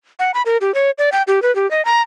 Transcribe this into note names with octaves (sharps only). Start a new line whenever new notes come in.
F#5
B5
A#4
G4
C#5
D5
G5
G4
B4
G4
D#5
A#5